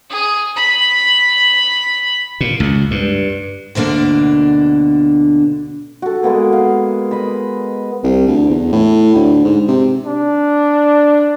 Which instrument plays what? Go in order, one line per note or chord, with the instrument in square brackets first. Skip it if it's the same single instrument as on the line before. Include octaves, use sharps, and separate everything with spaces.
[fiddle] G#4
B5
[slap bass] A#2
C#2
G2
[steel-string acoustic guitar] D2 B2 D3 A#3 D4
[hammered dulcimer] F#4 A4
G#3 A#3 B3 G#4
F5
D#5 B5
[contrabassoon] C2
D2
E2
A2
D2
G#2
C3
[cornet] D4